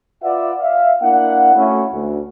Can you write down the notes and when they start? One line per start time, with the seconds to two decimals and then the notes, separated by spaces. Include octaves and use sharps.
0.23 F4 B4 D5 E5 F#5
0.59 E5 F5
1.02 A#3 D4 E4 F5 F#5
1.55 A3 C#4 E4 F#4
1.94 D2